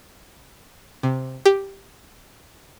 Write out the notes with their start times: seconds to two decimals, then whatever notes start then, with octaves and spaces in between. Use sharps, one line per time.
1.03 C3
1.46 G4